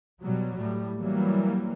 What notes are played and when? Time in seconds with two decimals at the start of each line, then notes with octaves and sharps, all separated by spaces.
0.21 B2 F#3 G3
0.54 A2 G3
0.98 E3 F#3 G3 A#3